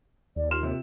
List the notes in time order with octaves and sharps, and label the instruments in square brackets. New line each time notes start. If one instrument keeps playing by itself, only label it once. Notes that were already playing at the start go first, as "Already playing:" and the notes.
[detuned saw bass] D#2 [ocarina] D5
[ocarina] F4 [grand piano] C6 F6 E7
[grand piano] C3